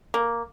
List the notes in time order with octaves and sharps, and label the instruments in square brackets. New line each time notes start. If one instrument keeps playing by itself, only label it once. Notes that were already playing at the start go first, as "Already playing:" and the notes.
[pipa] A#3